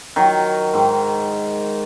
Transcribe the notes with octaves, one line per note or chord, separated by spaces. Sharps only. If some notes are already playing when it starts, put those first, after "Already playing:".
D#3 F#3
G#2 D#3